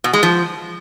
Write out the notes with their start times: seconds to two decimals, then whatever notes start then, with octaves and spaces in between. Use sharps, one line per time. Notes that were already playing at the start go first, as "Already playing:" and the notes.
0.04 B2
0.13 G#3
0.23 F3